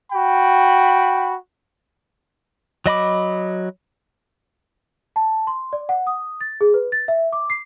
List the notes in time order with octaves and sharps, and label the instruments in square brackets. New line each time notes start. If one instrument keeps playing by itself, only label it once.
[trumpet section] F#4 G5 B5
[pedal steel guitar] F#3 D#5 B5 D6
[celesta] A5
C6
D5
F#5
D#6
A6
G#4
B4
A6
E5
D6
C7